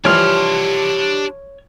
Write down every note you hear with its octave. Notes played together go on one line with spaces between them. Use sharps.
E3 F3 G3 D4 G4 C#5 C6 F6